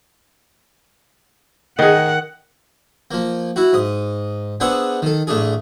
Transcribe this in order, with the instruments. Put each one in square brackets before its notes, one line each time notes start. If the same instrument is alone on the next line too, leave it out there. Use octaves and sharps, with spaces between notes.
[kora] D#3 [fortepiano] D#4 G#4 [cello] F#5
[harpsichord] F3 A#3
E4 F#4
G#2 D#6
B3 D4 G#4 C5 E5 F#5
D#3 A4
A1 A3 D4 G#4